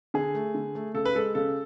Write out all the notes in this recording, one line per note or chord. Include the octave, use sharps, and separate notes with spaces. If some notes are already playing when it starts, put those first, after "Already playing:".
D3 G#4
A3
D3
A3
C#3 A4
B4
G#3 A4
C#3 A4